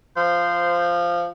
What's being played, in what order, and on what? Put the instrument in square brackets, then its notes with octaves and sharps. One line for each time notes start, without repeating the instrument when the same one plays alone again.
[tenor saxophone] F3 [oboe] C5